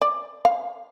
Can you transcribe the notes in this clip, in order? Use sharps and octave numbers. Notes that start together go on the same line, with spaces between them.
D5
F5